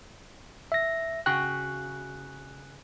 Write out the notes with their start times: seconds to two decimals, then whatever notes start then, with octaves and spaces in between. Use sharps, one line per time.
0.72 E5 A#6
1.26 C#3 F#4 G5 F#6